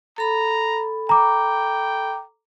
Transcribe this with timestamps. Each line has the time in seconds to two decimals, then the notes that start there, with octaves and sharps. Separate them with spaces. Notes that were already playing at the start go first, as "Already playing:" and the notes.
0.18 A4 A#5 B5
1.09 G5 A#5 D6